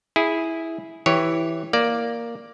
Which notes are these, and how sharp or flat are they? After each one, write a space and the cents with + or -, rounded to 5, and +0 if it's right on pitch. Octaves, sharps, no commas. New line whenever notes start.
E4 -5 G#4 +0
E3 +0 G4 +0 C#5 +0
A#3 +0 D5 +0